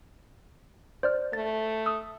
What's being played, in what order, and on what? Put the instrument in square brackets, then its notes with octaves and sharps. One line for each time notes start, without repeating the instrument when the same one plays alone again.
[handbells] C5 D5 F6
[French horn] A3 [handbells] A6
[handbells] D#6 E6